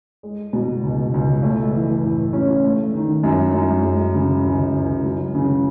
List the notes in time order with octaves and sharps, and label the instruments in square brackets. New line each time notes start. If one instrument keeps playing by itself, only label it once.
[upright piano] G#3
B2
C#2
C#2
A3
E3
A2
C#4
A3
D#3
F#2
F#2
G#3
C#3
C#2
C#2
F#3
C#3